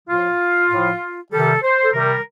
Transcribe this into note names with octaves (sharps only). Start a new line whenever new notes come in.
A2 F3 F4
A2 F3
C3 D#3 G3 A4
C5
A4
C3 D#3 G3 A#4